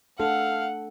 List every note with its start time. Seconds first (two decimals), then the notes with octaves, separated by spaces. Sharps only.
0.20 A3 D4 A4 F5 F#5